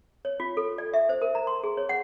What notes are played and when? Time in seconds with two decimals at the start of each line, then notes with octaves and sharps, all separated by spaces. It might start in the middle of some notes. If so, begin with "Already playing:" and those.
0.25 C#5
0.40 F4
0.57 A4
0.78 D5
0.94 E5
1.09 C5
1.22 A#4
1.35 A#5
1.47 C6
1.64 G#4
1.77 C#5
1.89 F#5